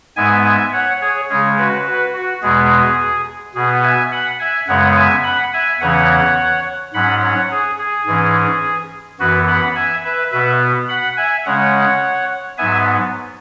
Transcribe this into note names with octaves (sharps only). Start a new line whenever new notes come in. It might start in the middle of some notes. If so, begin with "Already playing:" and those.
G#2 G#3 B3 E5 G#5
E5 G#5
C#5 F#5
G#4 C#5
C#3 G#3 C#4 G#4 C#5
F#4 B4
F#4 B4
F#4
E2 B2 G#3 B3 G#4
B2 B3 G#4
E5 G#5
F#5 B5
E5 G#5
F#2 C#3 G#3 B3 C#5 F#5
E5 G#5
F#5 B5
E5 G#5
E2 C#3 E3 C#4 C#5 F#5
G#2 F#3 C#4 F#5 B5
C#5 F#5
G#4
G#4
G#2 E3 C#4
F#2 E3 B3 F#4 B4
F#5 B5
E5 G#5
B4 E5
B2 B3 B4 E5
F#5 B5
E5 G#5
C#3 G#3 C#4 C#5 F#5
G#2 F#3 B3 E5 G#5